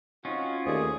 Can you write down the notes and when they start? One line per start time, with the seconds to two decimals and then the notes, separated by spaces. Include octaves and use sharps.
0.25 C4 C#4 D#4 F4 F#4
0.66 D#2 A3 G#4 C5 D5